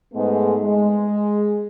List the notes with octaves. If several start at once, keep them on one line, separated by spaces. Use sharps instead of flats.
G#2 G#3 A3 B3
G#3